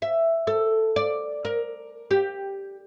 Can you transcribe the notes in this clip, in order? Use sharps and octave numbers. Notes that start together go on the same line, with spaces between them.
E5
A4
D5
A#4
G4